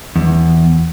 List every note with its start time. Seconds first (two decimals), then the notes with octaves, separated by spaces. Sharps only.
0.16 E2